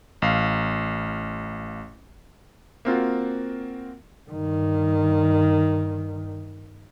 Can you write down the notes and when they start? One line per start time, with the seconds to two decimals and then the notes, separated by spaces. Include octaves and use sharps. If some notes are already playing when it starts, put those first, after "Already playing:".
0.22 A1 F5
2.85 A#3 C4 F4 F#4
4.30 G2 D#3